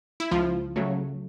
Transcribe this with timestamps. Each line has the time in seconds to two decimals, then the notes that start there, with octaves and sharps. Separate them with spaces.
0.20 E4
0.31 C#2 F3 F4
0.76 C#3 F#3 A3